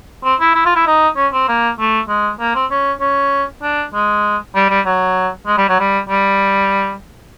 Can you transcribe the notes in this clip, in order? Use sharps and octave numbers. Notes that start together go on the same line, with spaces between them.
C4
E4
E4
F4
E4
D#4
C#4
C4
A#3
A3
G#3
A#3
C4
C#4
C#4
D4
G#3
G3
G3
F#3
G#3
G3
F#3
G3
G3